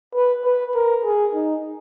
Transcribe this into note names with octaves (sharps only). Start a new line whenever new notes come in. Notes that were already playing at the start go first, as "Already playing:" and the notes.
B4
B4
A#4
G#4
D#4